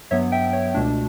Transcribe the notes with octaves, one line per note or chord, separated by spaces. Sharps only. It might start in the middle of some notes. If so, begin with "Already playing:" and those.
G2 F#3 B3 C#5 E5
E5 G5
C#5
C#2 B2 A3 D4